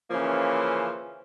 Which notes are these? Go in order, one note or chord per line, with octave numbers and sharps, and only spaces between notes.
C#3 E3 F3 A#3 C#4 C5